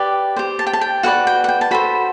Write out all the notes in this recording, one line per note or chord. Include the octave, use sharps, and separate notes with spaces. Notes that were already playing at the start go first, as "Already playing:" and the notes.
Already playing: G4 B4 D5
G4 C5
A5
G5
A5
G5
F#4 B4 D5 F#5
G5
F#5
G5
A5
F#4 A4 C5 B5